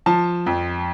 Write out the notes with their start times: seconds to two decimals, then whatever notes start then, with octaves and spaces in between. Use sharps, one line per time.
0.06 F3 A5
0.46 F2